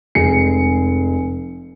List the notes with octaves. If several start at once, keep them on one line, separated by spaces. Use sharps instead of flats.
F1 G#3 G#5 C7 C#7